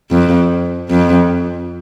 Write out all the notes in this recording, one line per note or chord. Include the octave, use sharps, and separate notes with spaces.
F2
F2